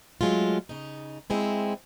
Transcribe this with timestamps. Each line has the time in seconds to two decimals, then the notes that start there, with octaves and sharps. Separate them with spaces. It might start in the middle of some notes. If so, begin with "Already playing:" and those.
0.21 F#3 G#3 A3 F4
0.69 C#3 D#4
1.30 G#3 C4 E4